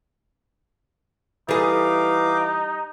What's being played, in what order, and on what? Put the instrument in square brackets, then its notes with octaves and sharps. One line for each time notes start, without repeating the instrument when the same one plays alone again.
[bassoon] E3 [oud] G3 G#4 [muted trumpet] D#4 [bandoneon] F5 D6